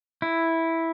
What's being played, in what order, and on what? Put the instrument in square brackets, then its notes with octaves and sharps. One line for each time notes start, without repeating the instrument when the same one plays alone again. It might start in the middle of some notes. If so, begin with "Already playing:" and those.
[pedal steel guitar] E4